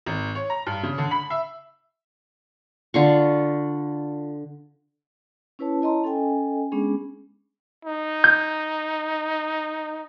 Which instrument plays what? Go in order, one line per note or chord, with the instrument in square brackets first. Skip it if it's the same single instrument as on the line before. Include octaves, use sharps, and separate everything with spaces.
[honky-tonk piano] G#1
C#5
A#5
G2
C#3
D3
B5
E5
[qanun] D3 F4 C#6
[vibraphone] C#4 E4 B4 C#5 A5
E4 C#5 D#5 A5 A#5 C6
C#4 A4 D#5 G5 G#5
G#3 B3 C#4 D4 G#4
[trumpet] D#4
[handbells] G6